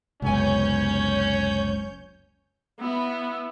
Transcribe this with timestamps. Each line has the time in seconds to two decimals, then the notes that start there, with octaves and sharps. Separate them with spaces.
0.22 F#1 C#2 C3 B3 C#4 C#5 G#5 G6
2.80 B3 E4